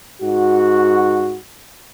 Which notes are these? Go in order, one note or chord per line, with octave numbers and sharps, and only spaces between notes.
G#2 F#4